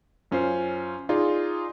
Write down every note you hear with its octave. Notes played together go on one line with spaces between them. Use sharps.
F#2 C#4 F4 C5
D#4 F4 G#4 D5 D#5